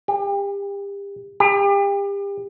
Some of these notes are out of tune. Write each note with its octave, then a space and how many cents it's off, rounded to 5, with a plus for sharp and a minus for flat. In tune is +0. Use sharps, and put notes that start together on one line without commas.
G4 +35
G4 +35